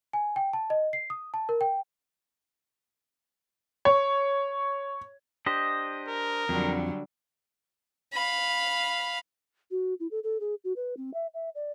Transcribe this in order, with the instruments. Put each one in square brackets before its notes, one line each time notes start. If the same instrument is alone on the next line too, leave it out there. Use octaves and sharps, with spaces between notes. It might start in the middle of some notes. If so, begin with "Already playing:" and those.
[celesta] G#5
G5
A5
D#5
C7
D#6
A5
A#4
G5
[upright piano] C#5
[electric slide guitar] D4 G4 C5 [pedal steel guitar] D#5
[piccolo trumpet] A#4
[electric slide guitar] F2 [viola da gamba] D3 F#3 G3
[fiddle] F5 B5
[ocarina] F#4
E4
A4
A4
G#4
F#4
B4
C4
E5
E5
D5